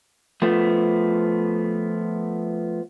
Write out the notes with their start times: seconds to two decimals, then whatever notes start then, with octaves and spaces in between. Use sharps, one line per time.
0.42 F3 A3 B3